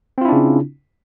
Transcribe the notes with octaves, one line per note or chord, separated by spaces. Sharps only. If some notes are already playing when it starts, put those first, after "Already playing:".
C#3 C4 D4 E4 F4